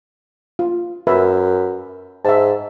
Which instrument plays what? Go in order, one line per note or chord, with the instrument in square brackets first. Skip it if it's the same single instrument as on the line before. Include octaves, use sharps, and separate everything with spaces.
[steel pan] F4
[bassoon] F#2 [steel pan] A#4 B4 E5
[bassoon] G#2 [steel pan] E5 A5